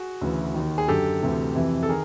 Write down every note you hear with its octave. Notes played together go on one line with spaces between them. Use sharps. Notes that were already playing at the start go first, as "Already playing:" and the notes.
Already playing: F#4 G#4
D2 C#3 E3
D#2 D#3
G#4
F#2 D3 G4 A4
D2 C3 E3
F2 C3 E3
A4
D#3 G#4 A#4